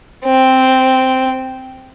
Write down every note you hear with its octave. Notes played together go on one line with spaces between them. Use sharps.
C4